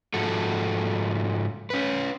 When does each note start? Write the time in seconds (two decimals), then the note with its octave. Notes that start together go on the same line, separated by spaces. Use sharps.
0.14 G#2 F3 F#4 A4
1.70 C#4 B4